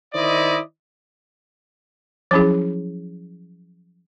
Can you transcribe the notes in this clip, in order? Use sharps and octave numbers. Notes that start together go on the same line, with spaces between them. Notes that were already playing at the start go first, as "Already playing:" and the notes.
D#3 E4 C5 D5 D#5
F3 F#3 C#4 E4 G#4